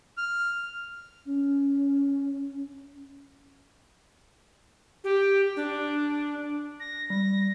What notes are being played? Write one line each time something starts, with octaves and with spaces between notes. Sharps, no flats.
F6
C#4
G4
D4
A#6
G3 A#6